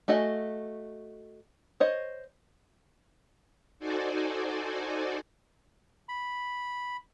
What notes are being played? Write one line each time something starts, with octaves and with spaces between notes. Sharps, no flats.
A3 F#4 D#5 G#5
C5 C#5 D#5
D#4 F#4 A4 C5 D5 G#5
B5